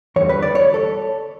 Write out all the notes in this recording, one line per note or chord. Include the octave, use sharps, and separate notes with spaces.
E2 D3 G3 C#5
B4
D5
C#5
A4